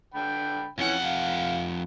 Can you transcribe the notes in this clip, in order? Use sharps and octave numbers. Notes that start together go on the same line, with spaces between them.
D3 G5 B5
F2 E3 C#4 F#5
F5